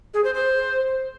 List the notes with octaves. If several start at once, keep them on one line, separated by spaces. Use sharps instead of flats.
G#4
C5
C5